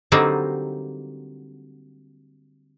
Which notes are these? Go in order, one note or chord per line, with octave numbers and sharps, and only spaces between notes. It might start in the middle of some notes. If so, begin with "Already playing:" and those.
D3 F#3 G3 A#3 C4 D#4